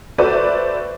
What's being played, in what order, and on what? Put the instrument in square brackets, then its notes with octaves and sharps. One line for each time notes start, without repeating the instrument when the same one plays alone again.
[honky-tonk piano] F#4 A4 B4 C5 D5 E5